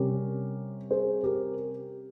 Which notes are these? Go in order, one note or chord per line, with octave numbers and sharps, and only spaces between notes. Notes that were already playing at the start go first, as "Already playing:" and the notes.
Already playing: C3 G3 C#4 G4 A#4
G#4 C5
G4 A#4